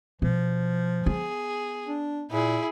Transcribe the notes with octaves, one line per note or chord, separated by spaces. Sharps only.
B2 F3
B3 G#4
D4
A#2 E4 G#4